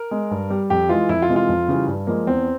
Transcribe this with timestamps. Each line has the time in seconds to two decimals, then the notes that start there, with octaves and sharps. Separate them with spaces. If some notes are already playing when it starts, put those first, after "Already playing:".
Already playing: A#4
0.11 G#3
0.31 G2
0.50 G3
0.70 F2 G4
0.89 E3 G#3 F4
1.09 F2 E4
1.22 F4
1.29 C3 E3 G#3
1.36 F4
1.49 F2
1.68 C#3 E3 G3
1.88 G2
2.07 F3 G#3 A#3
2.27 E2 C4